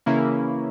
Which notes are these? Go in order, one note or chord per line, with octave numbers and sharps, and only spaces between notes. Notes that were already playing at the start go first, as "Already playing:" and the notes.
C#3 E3 A#3 C#4 E4